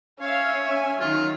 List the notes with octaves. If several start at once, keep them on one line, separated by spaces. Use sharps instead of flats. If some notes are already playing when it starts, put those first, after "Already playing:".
C#4 C#5 E5 F5
E5 G#5
D#3 F#3 F4